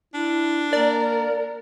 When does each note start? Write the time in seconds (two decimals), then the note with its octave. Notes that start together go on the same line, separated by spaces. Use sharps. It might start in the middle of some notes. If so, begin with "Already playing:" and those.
0.14 D4 E4
0.73 A#3 A#4 D5